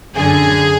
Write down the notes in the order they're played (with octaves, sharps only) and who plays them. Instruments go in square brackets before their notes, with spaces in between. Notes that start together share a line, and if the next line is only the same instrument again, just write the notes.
[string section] F#2 D3 F#3 G#4